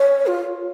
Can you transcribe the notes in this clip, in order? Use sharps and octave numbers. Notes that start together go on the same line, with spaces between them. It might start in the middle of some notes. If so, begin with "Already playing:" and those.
Already playing: C#5
F4